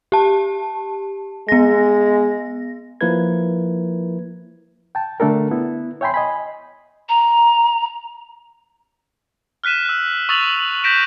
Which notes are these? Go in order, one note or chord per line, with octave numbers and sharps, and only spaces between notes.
G4 A5
G#3 B3 A#6
F3 A#3 E4 A#4 B4 G#6
G5 A5
D3 A3 D4 A4 A#4
B3 E4
C#5 E5 G5 G#5 B5 C6
D#5 G#5 B5
A#5
F6 F#6 B6 D#7 E7
E6 F#6
C#6 D#6 E6 A6 F7 F#7
G6 A#6 B6 D7 E7